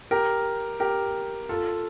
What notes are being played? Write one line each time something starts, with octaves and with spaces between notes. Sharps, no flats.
G4 A#4
G4 A#4
F4 A4